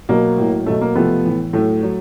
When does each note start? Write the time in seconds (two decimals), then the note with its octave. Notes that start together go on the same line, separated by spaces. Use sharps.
0.09 B2 F#3 A#3
0.38 A2 F#3
0.66 B2 F#3 A3
0.81 A#3
0.95 C3 F3 A3 B3
1.25 A2 E3
1.53 A2 F#3 A3
1.83 F#3